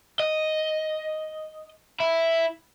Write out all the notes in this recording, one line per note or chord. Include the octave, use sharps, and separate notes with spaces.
D#5
E4